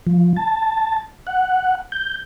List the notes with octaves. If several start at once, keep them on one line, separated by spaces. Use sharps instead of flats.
F3
A5
F#5
G6